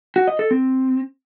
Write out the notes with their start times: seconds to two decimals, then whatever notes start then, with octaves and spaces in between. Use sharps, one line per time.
0.16 F#4
0.28 D#5
0.39 A4
0.51 C4